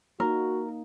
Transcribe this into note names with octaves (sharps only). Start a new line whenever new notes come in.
A#3 D#4 F#4 A#4